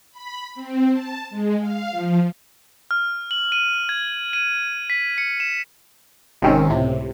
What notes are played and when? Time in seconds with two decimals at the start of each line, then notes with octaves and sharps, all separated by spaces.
0.12 B5
0.55 C4
0.91 A5
1.30 G#3
1.60 F5
1.91 F3
2.91 F6
3.31 F#7
3.52 D#7
3.89 G#6
4.33 D#7
4.90 B6
5.18 C#7
5.40 E7
6.42 G#1 G#2 C3 D#3 C4 C#4
6.69 C#2 A2 C3